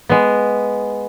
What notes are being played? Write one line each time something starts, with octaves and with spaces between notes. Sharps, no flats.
G#3 B3